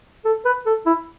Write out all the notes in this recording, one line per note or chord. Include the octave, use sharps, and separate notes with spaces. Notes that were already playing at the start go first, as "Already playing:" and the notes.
A4
B4
A4
E4